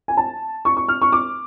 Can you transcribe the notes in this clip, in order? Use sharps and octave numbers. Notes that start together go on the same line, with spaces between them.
G#5
A5
C#6
C#6
F6
C#6
D6